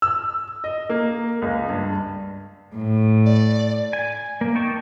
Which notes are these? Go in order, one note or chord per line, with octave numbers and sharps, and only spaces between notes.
E6
D#5
A#3
C#2
G2
A2
D5
G#5
A#3
D#4 G5 A5 C#6